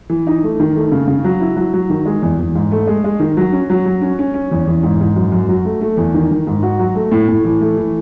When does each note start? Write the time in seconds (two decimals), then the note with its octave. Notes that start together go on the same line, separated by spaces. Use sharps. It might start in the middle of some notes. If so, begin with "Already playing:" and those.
0.10 E3
0.27 D#4
0.43 A3
0.60 D#3
0.76 A3
0.92 C#3
1.08 C#3
1.24 F#3
1.41 E4
1.56 F#3
1.74 F#3
1.90 D#3
2.05 G#3
2.22 E2
2.39 E2
2.55 G#2
2.71 A3
2.87 G#3
3.04 G#3
3.20 D#3
3.37 F#3
3.52 C#4
3.70 F#3
3.86 F#3
4.02 C#4
4.19 C#4
4.34 C#4
4.51 E2
4.67 E2
4.83 G#2
5.01 G#2
5.16 F#2
5.32 F#2
5.48 F#3
5.65 A3
5.81 A3
5.97 E2
6.14 D#3
6.31 D#3
6.47 G#2
6.63 F#4
6.79 F#3
6.95 A3
7.12 A2
7.29 A2
7.45 E3
7.61 A3
7.77 E3